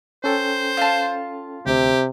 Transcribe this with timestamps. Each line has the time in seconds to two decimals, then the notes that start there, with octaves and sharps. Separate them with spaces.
0.24 C#4 A4 C5 G5
0.77 F4 A5
1.66 D2 C3 G4